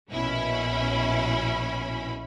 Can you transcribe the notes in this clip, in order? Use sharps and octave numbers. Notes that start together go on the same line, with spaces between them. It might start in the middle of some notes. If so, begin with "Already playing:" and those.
A#1 B2 C#4 E4 B5